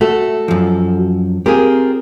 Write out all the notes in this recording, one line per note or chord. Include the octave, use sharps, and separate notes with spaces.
A3 F#4 A4
F#2 F3
C4 F4 G4 G#4 A#4